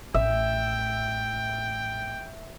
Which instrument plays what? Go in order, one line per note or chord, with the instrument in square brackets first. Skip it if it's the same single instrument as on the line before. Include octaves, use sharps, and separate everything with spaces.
[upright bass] A1 [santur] E5 [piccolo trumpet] G5